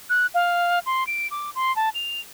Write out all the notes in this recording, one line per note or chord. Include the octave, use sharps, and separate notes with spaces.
F#6
F5
C6
D7
D6
C6
A5
F7